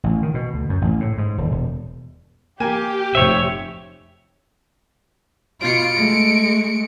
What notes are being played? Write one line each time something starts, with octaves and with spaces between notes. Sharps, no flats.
A1
D#3
B2
D2
F#2
A1
A2
G#2
D#1
E1
A#3 G4 G#5
F1 C5 C#5 E5
B2 F4 C#7 D7
G#3 A3